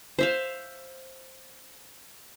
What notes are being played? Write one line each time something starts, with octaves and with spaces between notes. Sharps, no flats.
C5 E5 F5